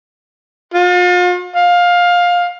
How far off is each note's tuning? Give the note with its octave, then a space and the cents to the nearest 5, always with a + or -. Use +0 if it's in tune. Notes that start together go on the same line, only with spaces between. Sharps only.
F4 +40
F5 +15